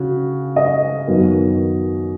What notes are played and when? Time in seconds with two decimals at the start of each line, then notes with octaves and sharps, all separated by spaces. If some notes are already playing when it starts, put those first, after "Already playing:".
Already playing: C#3 F#4
0.56 D#5
1.07 F#2 D#3 F#3 B3